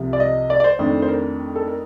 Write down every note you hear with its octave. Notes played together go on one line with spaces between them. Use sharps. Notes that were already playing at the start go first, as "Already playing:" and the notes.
Already playing: C2 C3 F3
D5
D#5
D5
D5
C5
F2 D#3 A3 D4
C5
A#4
A4
A#4